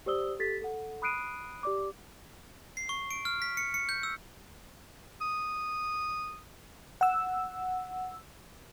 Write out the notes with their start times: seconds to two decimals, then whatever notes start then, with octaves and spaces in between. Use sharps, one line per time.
0.06 G4 C5 D5 D#6 E6 G7
0.39 G4 A4 A6 B6
0.62 A4 F#5
1.02 B5 D#6 F#6 C7 D7 D#7
1.63 G4 D5 D6
2.77 C7
2.89 C#6
3.11 D7
3.25 F6
3.42 B6
3.57 C#7
3.74 C#7
3.89 G6
4.03 E6
5.21 D#6
7.01 F#5 E6